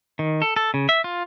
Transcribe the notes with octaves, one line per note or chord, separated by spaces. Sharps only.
D#3
A4
A4
C#3
E5
F4